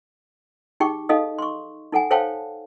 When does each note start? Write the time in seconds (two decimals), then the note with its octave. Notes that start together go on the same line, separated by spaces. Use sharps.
0.80 D#4 G4 G#4 G5 C#6
1.09 D#4 A4 D#5 F5 D#6
1.38 C6 C#6
1.92 D#4 A4 F#5 G#5
2.11 A4 C5 C#5 F5 G5 A5